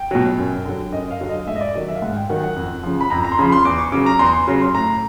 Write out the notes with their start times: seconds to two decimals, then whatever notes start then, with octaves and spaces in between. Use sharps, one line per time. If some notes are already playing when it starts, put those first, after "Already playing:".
Already playing: G5
0.11 B2 F#3
0.38 F#2
0.65 D3 F#3
0.92 F#2 D#5
1.11 F5
1.21 D3 F#3
1.29 D#5
1.47 G#2 E5
1.56 D#5
1.61 D5
1.75 D#3 F#3 D#5
1.88 E5
1.95 F5
2.02 G#2 F#5
2.16 G5
2.29 D#3 F#3 F#5
2.43 F#5
2.56 F2
2.83 C#3 F3
3.01 B5
3.10 F2 A#5
3.25 A#5
3.32 C6
3.39 C#3 F3 B5
3.52 C6
3.65 E2 D6
3.78 C#6
3.92 C#3 F#3 D6
4.06 A#5
4.19 E2 C6
4.34 C6
4.47 C#3 F#3
4.61 C6
4.75 A2 A#5